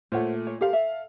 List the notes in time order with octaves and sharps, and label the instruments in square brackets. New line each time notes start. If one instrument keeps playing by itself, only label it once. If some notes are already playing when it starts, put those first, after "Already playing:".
[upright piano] A#2 A3 [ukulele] C5 C#5 F#5
[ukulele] C#5
[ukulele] G4 A#4 C5 [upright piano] A4 F5
[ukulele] E5